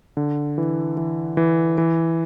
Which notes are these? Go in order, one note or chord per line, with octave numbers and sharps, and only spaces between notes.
D3
E3
E3
E3
E3